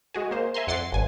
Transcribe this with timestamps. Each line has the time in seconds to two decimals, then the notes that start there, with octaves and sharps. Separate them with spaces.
0.14 G#3 F#4 G#4
0.31 A#3 C5
0.54 E5 G#5 A#5 C6
0.67 F2 F#5 C6 D6 A6 C7
0.92 G#1 G2 G#5